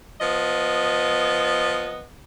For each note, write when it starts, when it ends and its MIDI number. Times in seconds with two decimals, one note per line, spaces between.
0.20 2.03 53
0.20 2.03 59
0.20 2.03 75